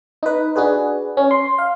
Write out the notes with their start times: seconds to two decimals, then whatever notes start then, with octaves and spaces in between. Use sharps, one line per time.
0.23 D#4 B4
0.56 D4 F#4 G#4 B4
1.17 C#4
1.31 C6
1.58 F5